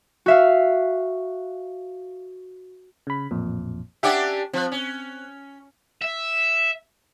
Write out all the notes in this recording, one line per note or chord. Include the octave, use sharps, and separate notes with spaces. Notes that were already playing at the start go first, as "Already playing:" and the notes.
F#4 E5 F5
C#3 B5
A1 F2 A#2
C#4 D4 G4 E5 F#5 D6
F3 C4 F#6
C#4
E5